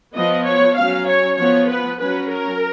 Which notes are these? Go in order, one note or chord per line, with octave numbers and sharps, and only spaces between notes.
F3 B3 D#5
C#5
F#3 C#4 F5
C#5
F3 B3 C#5
B4
F#3 C#4 B4
A#4